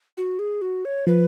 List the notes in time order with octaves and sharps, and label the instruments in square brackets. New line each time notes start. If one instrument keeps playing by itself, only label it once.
[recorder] F#4
G#4
F#4
C#5
[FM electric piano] F3 [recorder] B4